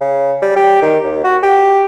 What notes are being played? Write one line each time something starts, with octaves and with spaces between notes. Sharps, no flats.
C#3
G3
G4
D#3
D#2
F#4
G4